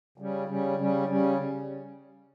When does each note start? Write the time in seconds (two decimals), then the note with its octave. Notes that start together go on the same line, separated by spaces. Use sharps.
0.18 C#3 G3 C#4
0.48 C#3 G3 C#4
0.78 C#3 G3 C#4
1.07 C#3 G3 C#4